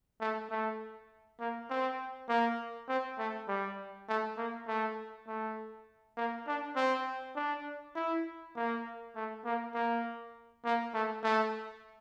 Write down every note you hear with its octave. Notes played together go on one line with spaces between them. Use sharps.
A3
A3
A#3
C4
A#3
C4
A3
G3
A3
A#3
A3
A3
A#3
D4
C4
D4
E4
A#3
A3
A#3
A#3
A#3
A3
A3